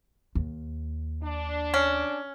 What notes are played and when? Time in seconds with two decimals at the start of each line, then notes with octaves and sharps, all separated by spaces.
0.35 D#2
1.23 D4
1.74 C#4